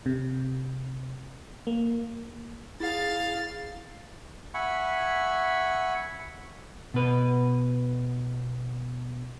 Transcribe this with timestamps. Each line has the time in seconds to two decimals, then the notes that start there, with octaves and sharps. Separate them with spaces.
0.06 C3
1.67 A#3
2.80 E4 G#4 F5 A6
4.54 E5 F#5 G#5 B5 C#6
6.94 B2 B4